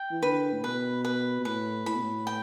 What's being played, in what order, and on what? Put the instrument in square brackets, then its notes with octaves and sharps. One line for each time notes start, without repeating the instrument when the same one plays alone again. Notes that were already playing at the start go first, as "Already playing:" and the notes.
Already playing: [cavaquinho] G5
[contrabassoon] E3
[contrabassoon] D3 [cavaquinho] B4
[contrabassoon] A2
[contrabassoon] B2 [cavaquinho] B4
[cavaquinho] B4
[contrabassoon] B2
[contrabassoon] A2 [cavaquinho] B4
[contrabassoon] A2 [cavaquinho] B5
[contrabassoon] B2
A2
[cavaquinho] G5